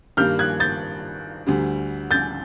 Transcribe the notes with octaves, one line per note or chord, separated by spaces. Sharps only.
G2 D#3 G3 A#3 F6 G6
F#6 G#6
G6 A6
D2 D3 G3
G6 A6